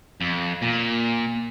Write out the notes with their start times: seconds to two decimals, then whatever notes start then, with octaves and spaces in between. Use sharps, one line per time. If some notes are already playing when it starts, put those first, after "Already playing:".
0.21 F2
0.62 A#2